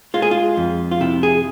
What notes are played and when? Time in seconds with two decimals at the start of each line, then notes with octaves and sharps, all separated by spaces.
0.14 G#3 F4
0.22 G#4
0.31 F4
0.57 F2
0.91 F4
1.01 C3 E4
1.23 G#4